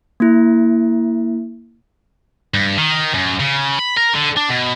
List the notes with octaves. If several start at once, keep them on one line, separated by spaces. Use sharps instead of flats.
A#3 E4
G2
D#3
F#2
C#3
B5
A#4
D3
D4
B2